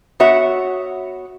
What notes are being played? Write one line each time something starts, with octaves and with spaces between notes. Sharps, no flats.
B3 F#4 C#5 E5 F#5